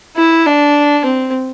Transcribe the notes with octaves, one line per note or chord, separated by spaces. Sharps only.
E4
D4
C4